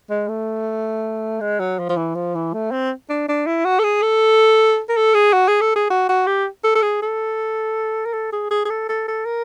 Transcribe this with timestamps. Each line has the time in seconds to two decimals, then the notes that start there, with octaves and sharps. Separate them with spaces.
0.10 G#3
0.28 A3
1.40 G#3
1.60 F#3
1.79 F3
1.89 F3
1.97 E3
2.15 F3
2.35 E3
2.54 A3
2.71 C4
3.09 D4
3.28 D4
3.46 E4
3.65 F#4
3.79 A4
3.83 G#4
4.02 A4
4.89 A#4
4.96 A4
5.14 G#4
5.33 F#4
5.48 G#4
5.61 A4
5.75 G#4
5.90 F#4
6.09 F#4
6.27 G4
6.64 A4
6.75 A4
6.82 G#4
7.02 A4
8.05 A#4
8.13 A4
8.32 G#4
8.51 G#4
8.65 G#4
8.70 A4
8.89 A4
9.08 A4
9.25 A#4